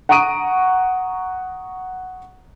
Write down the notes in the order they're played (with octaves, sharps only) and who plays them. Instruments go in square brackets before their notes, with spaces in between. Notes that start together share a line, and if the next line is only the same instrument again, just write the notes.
[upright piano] F#5 A#5 C#6 D#6 D7 D#7